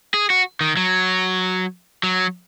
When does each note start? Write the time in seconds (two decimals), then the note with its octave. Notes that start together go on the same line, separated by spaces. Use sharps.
0.14 G#4
0.30 F#4
0.61 D#3
0.77 F#3
2.03 F#3